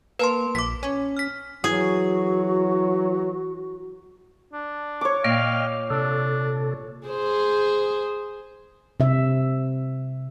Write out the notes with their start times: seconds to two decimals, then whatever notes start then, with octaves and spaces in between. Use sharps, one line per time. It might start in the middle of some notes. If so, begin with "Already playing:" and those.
0.19 A#3 B4 A5 C6
0.55 A#1 D6 B6
0.83 C#4
1.17 F6 B6
1.64 E3 F#3 F#4 G#4
4.53 D4
5.01 C#5 D6
5.24 A#2 D#5 F5 G5 F6
5.90 C3 D4 A4
7.07 G#4 C5
9.00 C3 E5